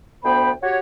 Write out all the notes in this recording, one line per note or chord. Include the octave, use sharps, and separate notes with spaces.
D2 B3 C5 G5 B5
F#4 G4 C#5